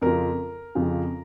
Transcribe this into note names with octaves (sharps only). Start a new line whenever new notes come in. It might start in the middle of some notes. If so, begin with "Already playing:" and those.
F2 C#3 F3 A#4
F2 C#3 F3